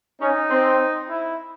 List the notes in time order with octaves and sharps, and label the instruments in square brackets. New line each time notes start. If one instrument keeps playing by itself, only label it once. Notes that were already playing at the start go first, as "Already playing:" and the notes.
[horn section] C#4 [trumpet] D#4
[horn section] C4
[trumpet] E4